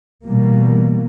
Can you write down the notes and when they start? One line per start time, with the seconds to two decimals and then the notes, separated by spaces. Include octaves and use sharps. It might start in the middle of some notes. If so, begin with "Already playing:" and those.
0.25 B2 E3 G3 A#3